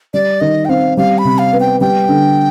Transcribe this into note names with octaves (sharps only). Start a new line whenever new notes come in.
G3 D5
D#3 D#5
G5
C4 F5
G3 F5
B5
C3
F5
B3
G5
G3 G5
D3